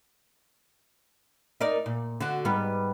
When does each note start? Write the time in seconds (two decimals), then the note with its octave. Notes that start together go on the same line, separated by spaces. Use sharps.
1.61 D#4 A#4 D5
1.86 A#2
2.20 D3 F#4
2.45 G#2 G3 B3